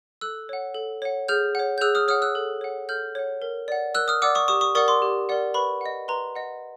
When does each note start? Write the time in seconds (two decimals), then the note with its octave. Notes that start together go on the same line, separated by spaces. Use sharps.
0.21 A4 E6 F#6
0.49 C#5 F#5
0.75 A4
1.02 C#5 F#5
1.28 G#4 F6 G6
1.55 C#5 F#5
1.78 G6
1.81 G#4 E6 F#6
1.95 D#6 F6
2.08 C#5 F#5 D#6 F6
2.22 E6 F#6
2.35 A4
2.61 C#5 F#5
2.89 A4 F6 G6
3.15 C#5 F#5
3.42 A#4
3.68 D5 F#5
3.95 A#4 E6 F#6
4.08 D#6 F6
4.22 D5 F#5 D6 E6
4.35 C#6 D#6
4.48 G4 C#6 D#6
4.61 C#6 D#6
4.75 A#4 D5 F#5 C#6 D#6
4.88 C6 D6
5.02 G4
5.29 A#4 D5 F#5
5.54 B4 B5 C#6
5.81 D#5 F#5
6.08 B4 A#5 C6
6.36 D#5 F#5